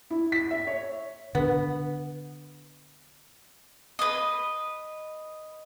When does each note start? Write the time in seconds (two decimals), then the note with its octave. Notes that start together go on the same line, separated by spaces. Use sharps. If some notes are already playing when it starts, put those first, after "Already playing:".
0.10 E4
0.32 B6
0.51 E5
0.67 C#5
1.35 D3 B3
3.99 B4 D#5